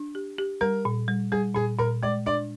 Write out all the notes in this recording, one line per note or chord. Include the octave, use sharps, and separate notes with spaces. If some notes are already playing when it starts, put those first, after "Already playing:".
Already playing: D4
G4
G4
G3 A#4
A#2
G3
G3 G#4
A#2 G#4
A#2 A#4
G#3 D5
D4 D5